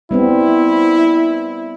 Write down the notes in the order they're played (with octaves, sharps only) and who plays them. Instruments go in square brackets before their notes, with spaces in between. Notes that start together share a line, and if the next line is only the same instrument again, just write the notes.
[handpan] G3 B3 C4 [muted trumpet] E4